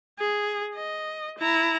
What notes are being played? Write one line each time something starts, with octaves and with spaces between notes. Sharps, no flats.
G#4
D#5
E4 A#5